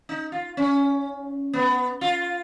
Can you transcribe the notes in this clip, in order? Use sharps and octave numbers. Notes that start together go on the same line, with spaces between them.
D#4
F4
C#4
B3
F4